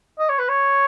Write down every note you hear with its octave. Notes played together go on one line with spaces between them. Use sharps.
D#5
C#5
B4
C#5